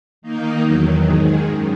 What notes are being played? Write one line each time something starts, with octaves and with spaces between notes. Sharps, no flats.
D#3 A#3 D#4
E2 D#3 F#3
G#2 D#3 G#3
F#2 D#3